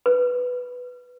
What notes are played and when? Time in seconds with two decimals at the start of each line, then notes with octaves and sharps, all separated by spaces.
0.06 B4